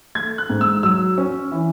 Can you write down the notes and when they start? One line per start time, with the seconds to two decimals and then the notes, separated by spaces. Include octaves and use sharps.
0.15 A3 G#6
0.38 F#6
0.50 G#2
0.61 E6
0.83 F#3 E6
1.18 C#4
1.52 E3